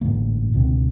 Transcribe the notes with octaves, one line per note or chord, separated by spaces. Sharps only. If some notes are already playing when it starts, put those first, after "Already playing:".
A1 G#2 D3 A#3
C#2 B2 D3 C4